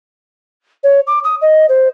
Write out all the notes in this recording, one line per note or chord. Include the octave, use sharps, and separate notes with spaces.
C#5
D6
D#6
D#5
C5